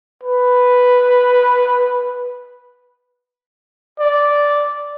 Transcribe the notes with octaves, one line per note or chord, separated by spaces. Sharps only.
B4
D5